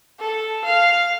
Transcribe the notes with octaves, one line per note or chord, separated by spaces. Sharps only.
A4
F5